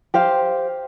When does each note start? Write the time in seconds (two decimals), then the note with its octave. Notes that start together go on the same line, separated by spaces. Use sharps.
0.14 G4 C5 F5